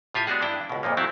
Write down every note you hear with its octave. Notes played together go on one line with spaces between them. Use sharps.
A2 F4 G4 G#5
G#3 B3 D4 F#4 G#4
G2 D4 E4 G5
C#2 B2
F2 A#2 F3 A#3
F#3 A3 C4 E4